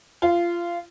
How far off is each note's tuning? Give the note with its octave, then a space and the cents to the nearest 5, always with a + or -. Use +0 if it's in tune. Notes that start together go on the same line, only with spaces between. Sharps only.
F4 -20